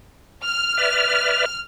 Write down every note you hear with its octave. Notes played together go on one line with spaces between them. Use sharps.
F6
B4 D5 E5